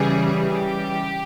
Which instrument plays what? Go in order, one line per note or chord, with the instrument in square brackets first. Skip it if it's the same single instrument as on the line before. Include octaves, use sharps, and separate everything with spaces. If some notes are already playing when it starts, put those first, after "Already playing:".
Already playing: [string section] C#3 E3 G3 G#4
G4